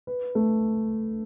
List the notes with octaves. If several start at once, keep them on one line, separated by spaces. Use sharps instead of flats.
B4
A3